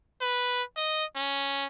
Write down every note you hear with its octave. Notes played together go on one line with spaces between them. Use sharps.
B4
D#5
C#4